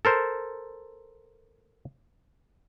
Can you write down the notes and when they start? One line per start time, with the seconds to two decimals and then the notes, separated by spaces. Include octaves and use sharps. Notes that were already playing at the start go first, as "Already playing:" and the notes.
0.05 A4 A#4 C5